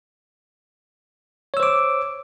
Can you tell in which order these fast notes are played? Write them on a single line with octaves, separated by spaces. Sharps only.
C#5 E6 C5 D6